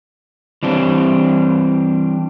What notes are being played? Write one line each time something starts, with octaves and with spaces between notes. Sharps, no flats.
E3 G3 C4 D4